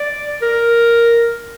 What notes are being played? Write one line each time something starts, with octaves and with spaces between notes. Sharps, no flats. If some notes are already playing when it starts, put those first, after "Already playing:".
Already playing: D5
A#4